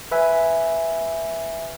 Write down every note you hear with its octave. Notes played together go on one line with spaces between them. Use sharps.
B4 E5 G#5